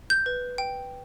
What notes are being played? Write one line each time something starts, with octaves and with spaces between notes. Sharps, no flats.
G6
B4
G5